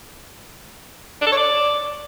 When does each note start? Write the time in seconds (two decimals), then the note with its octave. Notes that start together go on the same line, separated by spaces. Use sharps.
1.22 D4
1.27 A4
1.32 C#5
1.37 D5